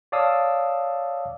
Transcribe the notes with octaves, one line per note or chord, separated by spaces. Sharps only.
C#5 D5 F5 A5 D#6 E6